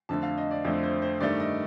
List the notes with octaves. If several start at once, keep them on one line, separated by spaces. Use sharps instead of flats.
F2 D3 A3 A5
F5
D#5
D5
F2 D3 A3 C5
C5
C5
G2 D#3 A3 D5
D#5